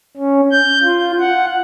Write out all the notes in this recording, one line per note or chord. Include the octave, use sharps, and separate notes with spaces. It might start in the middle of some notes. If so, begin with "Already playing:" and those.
C#4
G6
F4
F#5